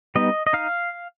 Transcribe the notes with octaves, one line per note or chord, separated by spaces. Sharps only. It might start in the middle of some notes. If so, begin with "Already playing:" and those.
G3 B3 D#4 D#5
D#5
D#4 F5